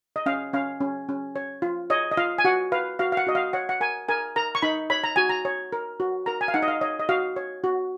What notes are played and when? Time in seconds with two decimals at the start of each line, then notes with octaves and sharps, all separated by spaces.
0.16 D#5
0.26 C#4 F5
0.53 C#4 F5
0.81 C#4
1.09 C#4
1.36 C#5
1.62 F4
1.90 C#5 D#5
2.11 D#5
2.17 F4 F5
2.38 G#5
2.45 F#4 F#5
2.72 B4 F5
2.99 F#4 F5
3.12 F5
3.17 F#5
3.27 F#4 D#5
3.35 F5
3.53 C#5 F#5
3.69 F#5
3.81 A#4 G#5
4.09 A#4 G#5
4.36 A#4 A#5
4.55 C#6
4.62 D#4 B5
4.90 C#5 B5
5.04 A#5
5.16 F#4 G#5
5.29 A#5
5.45 C#5
5.73 A#4
6.00 F#4
6.26 A#4 A#5
6.41 G#5
6.48 F5
6.54 D#4 F#5
6.63 D#5
6.68 F5
6.81 C#5 D#5
6.99 D#5
7.09 F#4 F5
7.36 C#5
7.64 F#4